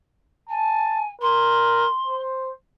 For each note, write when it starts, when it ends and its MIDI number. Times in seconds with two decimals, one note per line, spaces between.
0.49 1.11 80
0.49 1.00 81
1.21 1.87 70
1.21 2.21 84
2.06 2.52 72